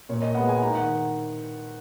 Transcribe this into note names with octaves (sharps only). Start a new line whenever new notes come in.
A#2 C#5
D#5
G#3 B3 F#5
G#5
D#3 A#5
F#5